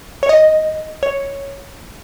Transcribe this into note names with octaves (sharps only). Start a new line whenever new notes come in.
C#5
D#5
C#5